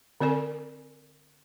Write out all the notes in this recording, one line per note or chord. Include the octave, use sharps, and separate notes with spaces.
D3 C4 A#4 D5 G#5